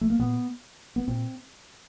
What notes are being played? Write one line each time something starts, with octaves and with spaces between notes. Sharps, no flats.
A3
A#3
A#2 B3
B3
A#2 C4